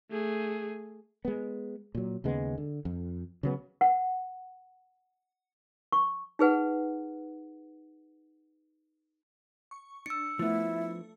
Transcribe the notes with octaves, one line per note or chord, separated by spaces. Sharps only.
A3 G#4
G#3 B3
A#2 F#3
D#2 C#3 G#3 B3
D3
F2
C#3 F#3 B3
F#5
C#6
D#4 G#4 B4 F#5
C#6
D4 E6 C#7
F3 A3 B3 E4